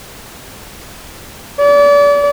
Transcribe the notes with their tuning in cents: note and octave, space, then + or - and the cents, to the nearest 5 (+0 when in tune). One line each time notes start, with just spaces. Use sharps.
D5 -35